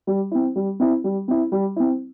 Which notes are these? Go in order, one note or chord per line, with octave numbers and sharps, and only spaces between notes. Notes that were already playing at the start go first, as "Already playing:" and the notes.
G3
C4 E4
G3
C4 E4
G3
C4 E4
G3
C4 E4